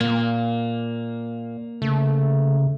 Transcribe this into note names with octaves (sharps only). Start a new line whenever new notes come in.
A#2 A#3
C#3 A3